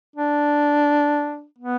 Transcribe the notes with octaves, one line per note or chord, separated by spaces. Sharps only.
D4
B3